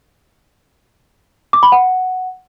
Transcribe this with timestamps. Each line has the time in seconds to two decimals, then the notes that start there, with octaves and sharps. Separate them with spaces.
1.53 D6
1.63 B5
1.72 F#5